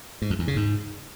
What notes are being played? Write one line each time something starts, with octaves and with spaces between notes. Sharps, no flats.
G#2
F2
E2
C#3
G#2